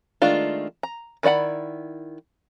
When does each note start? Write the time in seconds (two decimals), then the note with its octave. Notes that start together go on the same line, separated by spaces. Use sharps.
0.22 D#3 G#3 A3 D4 F4
0.83 A#5
1.23 D#3 E4 D5 F#5 B5